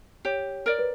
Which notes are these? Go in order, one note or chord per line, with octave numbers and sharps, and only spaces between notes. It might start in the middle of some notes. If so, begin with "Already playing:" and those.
G4 C#5
A#4 D5
B4